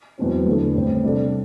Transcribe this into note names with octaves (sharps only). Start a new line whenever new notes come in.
E2 B2 F#3 C4
E2 D3 A3 D4 A4
A1 A2 G3 C4
C3 G3 D4 A4 D5